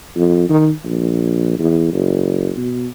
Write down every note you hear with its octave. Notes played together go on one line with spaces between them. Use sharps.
F2
D#3
A#1
E2
F#1
B2